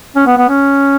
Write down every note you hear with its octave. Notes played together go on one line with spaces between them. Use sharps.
C#4
B3
B3
C#4